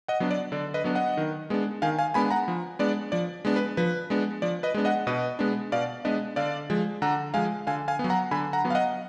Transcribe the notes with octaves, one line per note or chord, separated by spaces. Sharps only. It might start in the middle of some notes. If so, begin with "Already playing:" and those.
D#5 F#5
F#3 B3 D4
D5
D3 D5
B4 D#5
F#3 B3 D4
D#5 F#5
D#3
G#3 B3 D4
D#3 F5 G#5
F5 G#5
G#3 B3 D4 G#5 B5
F#5 A#5
F3
G#3 B3 D4 D5
F3 D5
G#3 B3 D4
B4
F3 B4
G#3 B3 D4
F3 D5
B4 D#5
G#3 B3 D4
D#5 F#5
B2 B4 D#5
G#3 B3 D4
B2 D5 F5
G#3 B3 D4 B4 D#5
D3 D5 F5
F3 G#3
D3 F#5 A#5
F3 G#3 F5 G#5
D3 F5 G#5
F5 G#5
B3
F#3
F#5 A#5
D3 G#5 B5
F#5 A#5
F#3 B3
F5
D#5 F#5